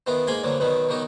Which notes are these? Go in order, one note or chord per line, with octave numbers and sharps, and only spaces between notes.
D#3 E3 B3 F4 A#4
G#2 A#3 A#4 G#5 B5 C6
G2 D3 F3 F#3 A#3
B1 B2 D#3 F#3 B3
B2 D#3 F#3 D#4 G4